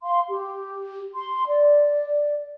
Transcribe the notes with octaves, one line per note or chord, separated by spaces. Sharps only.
F5 C6
G4
C6
D5